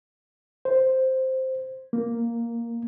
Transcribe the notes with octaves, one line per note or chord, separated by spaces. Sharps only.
C5
A#3